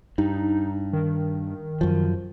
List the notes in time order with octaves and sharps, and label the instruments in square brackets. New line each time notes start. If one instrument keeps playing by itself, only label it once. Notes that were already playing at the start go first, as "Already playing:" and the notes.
[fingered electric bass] G2 [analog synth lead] D#4
[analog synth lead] D#3
[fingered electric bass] F#2 F3